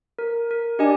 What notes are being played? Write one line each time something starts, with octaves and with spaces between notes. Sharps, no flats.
A#4
A#4
D4 G4 D#5 G#5